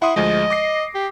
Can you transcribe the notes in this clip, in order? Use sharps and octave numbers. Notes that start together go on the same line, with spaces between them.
E4 F#5 C6 D#6
D2 F3 G#3 D#5
D6 A#6 C7
G4